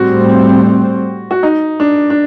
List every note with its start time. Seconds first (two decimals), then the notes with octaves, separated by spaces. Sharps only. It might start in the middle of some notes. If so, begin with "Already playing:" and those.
Already playing: A2 G3 C4 F#4
1.31 F#4
1.43 D#4
1.80 D4
2.10 D4